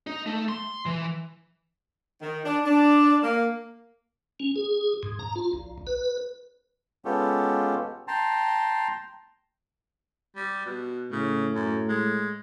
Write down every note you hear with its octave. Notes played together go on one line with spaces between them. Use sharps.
D#4
A3
C6
E3
D#3
D4
D4
A#3
C#4
G#4
G#2
A#5
F4
A#1
B4
G#3 B3 C#4 F4 G4 A4
G5 A5 A#5 C6
G3
B2
A2 C#3
F#2
G#3